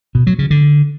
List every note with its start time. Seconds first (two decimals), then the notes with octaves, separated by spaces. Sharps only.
0.15 B2
0.27 F#3
0.39 C#3
0.51 D3